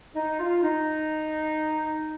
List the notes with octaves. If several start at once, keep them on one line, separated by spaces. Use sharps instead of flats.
D#4
F4
D#4